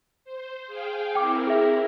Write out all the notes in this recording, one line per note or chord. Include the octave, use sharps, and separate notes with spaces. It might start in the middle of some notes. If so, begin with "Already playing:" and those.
C5
G#4 F5 G5
C4 E4 A#4 G5 D6
G#4 E5